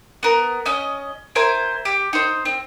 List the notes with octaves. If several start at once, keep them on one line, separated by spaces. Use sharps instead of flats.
B3 A#4
C#4 D#5
E4 A#4 C5 G#5
G4
D#4 C5
C4